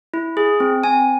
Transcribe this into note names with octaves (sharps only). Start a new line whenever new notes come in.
E4
G#4
C4
C4 G#5